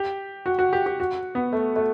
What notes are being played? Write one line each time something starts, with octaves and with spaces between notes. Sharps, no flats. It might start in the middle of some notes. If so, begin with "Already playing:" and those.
Already playing: G4
F#4
F#4
G4
G4
F#4
B3
A3
A3